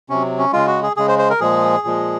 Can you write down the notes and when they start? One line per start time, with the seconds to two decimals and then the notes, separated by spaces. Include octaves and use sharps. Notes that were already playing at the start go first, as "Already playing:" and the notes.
0.10 C3 F#3 C#4
0.38 C#4
0.53 C#3 G#3 F4
0.67 F#4
0.83 G#4
0.97 C#3 G#3 G#4
1.08 C5
1.19 C5
1.30 A#4
1.40 A#2 F3 G#3 G#4
1.84 A#2 F3 G#3